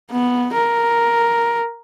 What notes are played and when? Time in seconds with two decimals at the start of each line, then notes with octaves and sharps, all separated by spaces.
0.11 B3
0.54 A#4